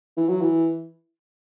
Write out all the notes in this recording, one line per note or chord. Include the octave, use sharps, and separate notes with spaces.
E3
F#3
E3